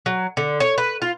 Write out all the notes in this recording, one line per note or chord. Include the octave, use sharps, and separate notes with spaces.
F#3
D3
C#5
B4
F4